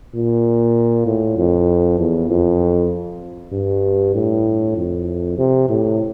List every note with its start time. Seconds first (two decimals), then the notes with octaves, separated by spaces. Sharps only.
0.15 A#2
1.06 A2
1.37 F2
1.99 E2
2.30 F2
3.52 G2
4.15 A2
4.77 F2
5.38 C3
5.69 A2